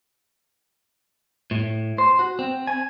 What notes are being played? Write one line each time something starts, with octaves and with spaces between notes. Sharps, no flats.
A2
C5
F#4
C4
G#5